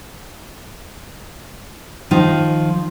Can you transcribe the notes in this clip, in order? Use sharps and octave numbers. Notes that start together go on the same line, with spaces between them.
D#3 F3 D#4